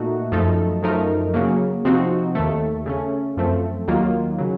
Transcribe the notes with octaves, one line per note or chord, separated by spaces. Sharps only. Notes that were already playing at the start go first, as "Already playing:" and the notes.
Already playing: A#2 A3 D#4 F#4
F#2 F3 A3 D#4 A4
F#2 F3 A3 D#4 A#4
C#3 F#3 A#3
C3 F3 C4 D#4 F#4
D#2 D#3 A3
C#3 A3 C#4
F#2 F3 A3 C4
D#2 D#3 F#3 A#3 F4
C#3 F#3